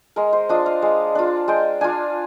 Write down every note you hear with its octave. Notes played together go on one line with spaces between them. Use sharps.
G#3 A#4
C5
D4 F4 D#5
F5
G#3
D4 F4
G#3 G5
D4 F4 G#5